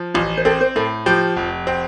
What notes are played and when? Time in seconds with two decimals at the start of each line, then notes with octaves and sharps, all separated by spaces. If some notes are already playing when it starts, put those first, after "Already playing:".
Already playing: F3
0.14 A1 F4
0.37 C5
0.45 C4 A4
0.61 C5
0.76 A2 A4
1.06 F3 G4
1.37 F1
1.67 C4